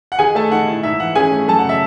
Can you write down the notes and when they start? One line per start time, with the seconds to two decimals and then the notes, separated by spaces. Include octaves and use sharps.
0.12 F#5
0.19 D#3 G#4 G#5
0.35 A3 A4 A5
0.51 D#3 F#5
0.68 E4
0.83 G#2 E5
1.00 E3 F#5
1.15 C#4 G#4 G#5
1.32 A3
1.48 F#2 A4 A5
1.59 F#5
1.65 C#3 E5